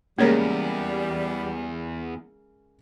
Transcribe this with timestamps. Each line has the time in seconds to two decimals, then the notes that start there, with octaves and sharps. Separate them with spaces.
0.19 E2 C#3 G3 G#3 A#3 A#4 C#5